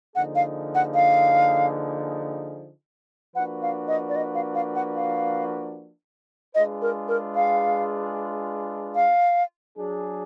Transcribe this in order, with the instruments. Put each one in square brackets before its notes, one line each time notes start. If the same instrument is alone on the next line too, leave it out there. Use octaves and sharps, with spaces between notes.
[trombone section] D3 F3 A#3 D#4 G#4 [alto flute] F#5
[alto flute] F5
F#5
F5
[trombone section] F3 A#3 D4 F#4 B4 [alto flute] F#5
[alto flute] F5
D#5
D5
D#5
F5
F5
F#5
F5
[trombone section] G#3 D4 F4 G#4 B4 [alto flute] D#5
[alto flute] A#4
A#4
F5
F5
[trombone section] F#3 D4 G#4